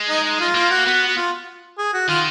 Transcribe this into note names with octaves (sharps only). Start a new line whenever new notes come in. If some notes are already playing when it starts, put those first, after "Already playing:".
Already playing: G#3
D#4
D#4
F4
A#3 F4
F#4
B3 F#4
F#4
F4
G#4
F#4
D#3 F4